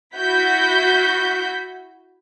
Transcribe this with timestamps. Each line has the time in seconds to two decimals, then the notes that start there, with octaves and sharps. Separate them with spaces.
0.16 E4 F#4 G6 B6